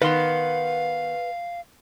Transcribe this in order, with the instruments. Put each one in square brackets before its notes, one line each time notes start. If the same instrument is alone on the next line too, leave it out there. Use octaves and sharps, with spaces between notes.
[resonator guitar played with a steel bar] D#3 B3 [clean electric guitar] B4 C6 [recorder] F5